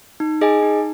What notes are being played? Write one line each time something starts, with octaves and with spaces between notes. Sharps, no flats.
D#4
G#4 D#5 G#5
D#4